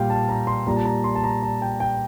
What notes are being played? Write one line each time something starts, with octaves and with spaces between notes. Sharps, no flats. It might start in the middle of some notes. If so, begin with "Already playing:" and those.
Already playing: A#2 G3 F5 G5
A5
A#5
C6
A#2 G3 A#5
A5
A#5
C6
A5
A#5
A5
G5
G5